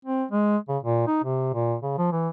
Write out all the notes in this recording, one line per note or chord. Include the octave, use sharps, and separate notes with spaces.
C4
G#3
C#3
A#2
D#4
C3
A#2
C#3
F3
E3